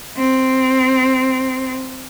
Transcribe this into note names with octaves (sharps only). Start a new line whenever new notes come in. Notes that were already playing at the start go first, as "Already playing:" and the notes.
C4